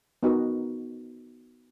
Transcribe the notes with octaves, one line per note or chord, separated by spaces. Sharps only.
B3 D#4 F#4 A#4